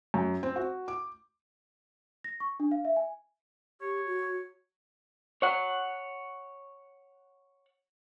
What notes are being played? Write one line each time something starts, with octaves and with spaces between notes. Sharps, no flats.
F#2
C4
F#4
D6
A#6
C#6
D4
F5
E5
G#5
G4 C#5
F#4
C#5 F#5